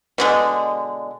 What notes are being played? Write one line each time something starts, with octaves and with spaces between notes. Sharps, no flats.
B2 D3 G#3